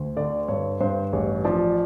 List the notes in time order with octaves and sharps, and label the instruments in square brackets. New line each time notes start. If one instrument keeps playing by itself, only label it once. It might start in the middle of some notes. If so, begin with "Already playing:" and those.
Already playing: [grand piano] D2
D3 D5
G2 C#5
G2 C5
A1 C#5
F3 D5